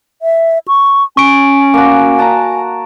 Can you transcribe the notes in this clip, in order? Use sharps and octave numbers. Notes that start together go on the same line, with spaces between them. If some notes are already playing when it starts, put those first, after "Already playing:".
E5
C#6
C#4 G#5 C#6 D7
A#3 F#4
A5 A#5